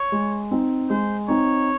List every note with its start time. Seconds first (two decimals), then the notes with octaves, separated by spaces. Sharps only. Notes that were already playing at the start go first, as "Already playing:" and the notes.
Already playing: C#5
0.12 G#3
0.51 C4 D#4
0.90 G#3 C5
1.28 C4 D#4 C#5